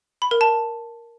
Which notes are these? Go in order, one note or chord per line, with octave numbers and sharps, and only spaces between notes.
B5
A#4
A5